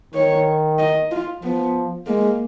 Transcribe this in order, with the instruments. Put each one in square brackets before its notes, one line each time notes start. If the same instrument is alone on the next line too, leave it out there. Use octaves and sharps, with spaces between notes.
[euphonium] D#3 [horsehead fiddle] C#5
[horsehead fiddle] D#5
F4
[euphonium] F3 [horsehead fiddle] B3
[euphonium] G#3 [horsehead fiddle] A#3